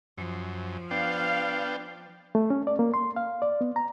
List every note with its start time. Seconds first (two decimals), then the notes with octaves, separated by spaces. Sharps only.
0.17 F#2 F3
0.91 B3 D4 F5 G5
2.35 A3
2.50 C#4
2.67 D5
2.79 A#3
2.94 C6
3.16 F5
3.42 D5
3.61 B3
3.76 A#5